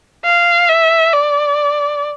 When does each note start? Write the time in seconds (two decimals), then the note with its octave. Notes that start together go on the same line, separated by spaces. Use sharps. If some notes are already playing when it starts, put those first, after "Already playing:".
0.25 F5
0.69 E5
1.12 D5